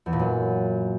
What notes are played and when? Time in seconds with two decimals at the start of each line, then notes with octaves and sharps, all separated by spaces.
0.06 E2
0.13 A#2
0.19 F#2